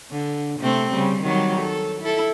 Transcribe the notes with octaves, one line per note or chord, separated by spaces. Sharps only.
D3
C3 A3 C4
C#3 G3
D#3 F#3 G3
A4
E4 A4